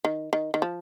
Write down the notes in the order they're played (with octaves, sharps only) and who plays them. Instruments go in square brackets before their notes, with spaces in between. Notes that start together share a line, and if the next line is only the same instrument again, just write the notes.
[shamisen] D#3
D#3
D#3
F3